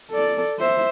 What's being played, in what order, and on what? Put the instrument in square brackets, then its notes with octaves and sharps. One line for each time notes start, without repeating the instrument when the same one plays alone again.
[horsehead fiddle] A4 D5
C5 E5